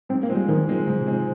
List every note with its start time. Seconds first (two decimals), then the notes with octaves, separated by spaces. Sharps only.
0.09 G#2 C4
0.23 A#3
0.29 F3 G#3 C4
0.35 G3
0.48 G#2 D#3
0.68 F3 G#3 C4
0.87 G#2 C#3
1.01 C3
1.07 F3 G#3 C4